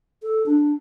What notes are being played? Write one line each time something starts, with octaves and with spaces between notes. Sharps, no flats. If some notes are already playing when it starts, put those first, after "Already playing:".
A4
D4